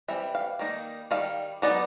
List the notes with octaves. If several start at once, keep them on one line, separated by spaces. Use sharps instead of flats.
E3 G3 C4 E5
F5
D#3 G3 A#3 D#4
D#3 G3 F5
F#3 B3 D#4 D5